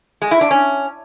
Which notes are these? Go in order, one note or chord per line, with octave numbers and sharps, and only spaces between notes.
G#3
E4
D4
C#4